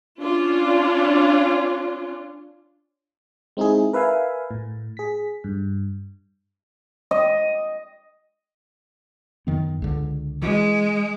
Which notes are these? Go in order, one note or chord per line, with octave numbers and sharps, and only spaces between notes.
C#4 D4 F4
G#3 C4 D#4 E4 G#4
A#4 B4 E5 F5 G#5
A2
G#4 B6
G2
D#5
F#2 D#3 B3
C#2 D3
E3 G#3